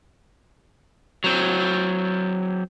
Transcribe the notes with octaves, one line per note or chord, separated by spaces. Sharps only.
F#3 C4